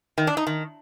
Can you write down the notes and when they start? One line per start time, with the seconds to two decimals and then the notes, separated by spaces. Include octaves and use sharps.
0.18 D#3
0.27 D4
0.37 D#4
0.47 D#3